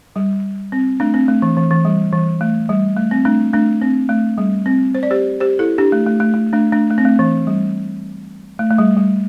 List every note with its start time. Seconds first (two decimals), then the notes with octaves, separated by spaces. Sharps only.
0.16 G3
0.72 C4
1.00 A3 D4
1.14 C4
1.28 A3
1.42 E3
1.57 E3
1.71 E3
1.85 G3
2.13 E3
2.41 A3
2.69 G3
2.97 A3
3.11 C4
3.25 A3 D4
3.54 A3 D4
3.81 C4
4.09 A3
4.38 G3
4.66 C4
4.95 C5
5.03 D5
5.11 G4 C5
5.40 G4 C5
5.59 E4 A4
5.78 D4 G4
5.92 A3
6.07 A3
6.20 A3
6.34 A3
6.53 A3 D4
6.72 A3 D4
6.90 A3
6.98 C4
7.05 A3
7.19 E3
7.47 G3
8.59 A3
8.71 A3
8.78 G3
8.97 G3